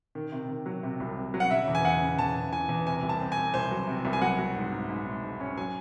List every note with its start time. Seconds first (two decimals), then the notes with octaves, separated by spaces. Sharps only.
0.15 D#3
0.32 C3
0.49 D#3
0.66 F#3
0.83 C3
1.00 C2
1.17 C3
1.34 F#3
1.40 F#5
1.51 C#3 E5
1.68 E2
1.75 G#5
1.85 E2 F#5
2.02 C#3
2.19 E2 A5
2.36 C#3
2.52 E3 G#5
2.69 E2
2.87 C3 G#5
3.03 C2
3.09 A5
3.20 C4
3.32 G#5
3.37 C2
3.54 C2 C5
3.71 F#3
3.87 C3
4.05 C2
4.13 G#5
4.22 F#3 F#5
4.39 F#3
4.56 G#2
4.72 G#2
4.89 G#2
5.06 G#2
5.24 G#2
5.40 C#4
5.57 F#3 G#5